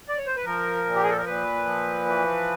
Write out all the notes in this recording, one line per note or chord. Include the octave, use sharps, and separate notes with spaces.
D5
C#5
C5
B4
F3 A#4
A#2
G4
G#4
A4
A#4
A#2 B4
F3
E3